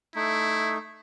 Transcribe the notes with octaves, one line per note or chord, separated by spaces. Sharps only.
A3 D#4 E4